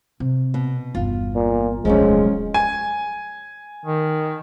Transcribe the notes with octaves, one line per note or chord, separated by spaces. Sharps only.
C3
B2
G1 E2 F4
A#2
D1 B1 F3 F#3 G#3 C#4
G#5
D#3